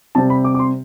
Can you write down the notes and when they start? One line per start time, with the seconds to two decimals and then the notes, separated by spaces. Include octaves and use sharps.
0.15 C3 G3 C4 A5
0.30 B5
0.44 D6
0.55 D6
0.59 C6